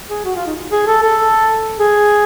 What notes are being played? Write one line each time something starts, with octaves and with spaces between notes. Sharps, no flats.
G#4
F#4
F4
D#4
G#4
A4
A4
G#4